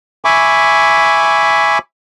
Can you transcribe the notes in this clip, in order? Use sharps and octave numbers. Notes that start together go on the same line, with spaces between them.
E5 G#5 B5 C#6 D6